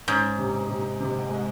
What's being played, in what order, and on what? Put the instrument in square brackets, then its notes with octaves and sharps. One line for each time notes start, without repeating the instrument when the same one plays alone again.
[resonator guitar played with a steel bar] G#2 [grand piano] C#4
[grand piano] C3
C3
C3
G#3